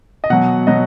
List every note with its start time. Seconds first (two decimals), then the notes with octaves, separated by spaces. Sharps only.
0.24 D#5
0.30 B2 F#3 F#5
0.67 B2 F#3 D#5